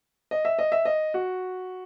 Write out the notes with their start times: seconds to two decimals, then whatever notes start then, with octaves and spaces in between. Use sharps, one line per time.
0.31 D#5
0.45 E5
0.59 D#5
0.72 E5
0.85 D#5
1.14 F#4